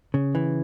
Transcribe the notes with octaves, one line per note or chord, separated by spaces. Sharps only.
C#3
E3